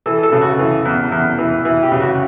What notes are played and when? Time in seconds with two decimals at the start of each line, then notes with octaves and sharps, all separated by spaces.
0.06 E3 A4
0.23 A4
0.32 C#3
0.41 F#4
0.59 E3
0.85 E2
1.12 E2
1.39 E3
1.65 E3 E4
1.83 G4
1.92 C#3
2.00 F#4